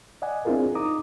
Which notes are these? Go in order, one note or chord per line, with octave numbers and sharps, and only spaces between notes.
D5 D#5 F#5 G#5
C4 D4 E4 F4 G#4 A#4
D#4 A#5 D6 D#6